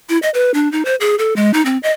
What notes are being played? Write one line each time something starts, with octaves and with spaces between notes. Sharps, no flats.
E4
D#5
B4
D4
D#4
C5
G#4
A4
G#3
D#4
C4
D#5